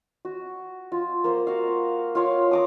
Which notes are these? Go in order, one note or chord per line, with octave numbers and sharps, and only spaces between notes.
F#4
F4
A#3 C5
F#4 F5
F4 C#5 F5 D6
A#5 D6 D#6